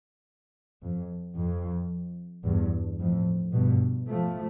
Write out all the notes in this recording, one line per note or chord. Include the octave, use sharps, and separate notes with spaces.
F2
F2
E2 G2
F2 A2
G2 B2
F3 A3